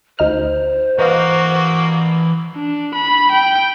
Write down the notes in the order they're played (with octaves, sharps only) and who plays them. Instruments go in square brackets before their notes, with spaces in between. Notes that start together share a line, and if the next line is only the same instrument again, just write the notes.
[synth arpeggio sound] D2 D#4 F6 [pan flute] C5
[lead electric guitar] E3 A#5 [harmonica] A#3 F#4 [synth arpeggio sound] B4 D#5 F5
[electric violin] D4
B5
G5